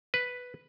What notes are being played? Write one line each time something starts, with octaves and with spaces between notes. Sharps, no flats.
B4